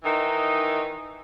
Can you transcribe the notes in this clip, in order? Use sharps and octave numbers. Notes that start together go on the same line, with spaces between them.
D#3 E3 D#4